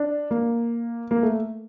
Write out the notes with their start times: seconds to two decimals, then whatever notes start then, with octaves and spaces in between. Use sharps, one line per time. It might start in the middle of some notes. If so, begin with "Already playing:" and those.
Already playing: D4
0.31 A#3
1.11 A#3
1.23 A3